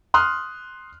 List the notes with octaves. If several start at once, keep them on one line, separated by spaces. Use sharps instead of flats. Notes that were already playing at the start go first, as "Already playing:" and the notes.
C6 D#6 F6 F#6